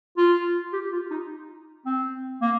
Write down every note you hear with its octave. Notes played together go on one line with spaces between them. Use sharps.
F4
G4
F4
D#4
C4
A#3